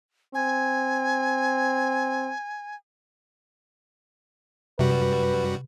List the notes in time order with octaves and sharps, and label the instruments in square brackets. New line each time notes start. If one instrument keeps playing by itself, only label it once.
[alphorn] C4 [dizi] G#5
[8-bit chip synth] F#2 G3 F#4 [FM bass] C3 [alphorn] B4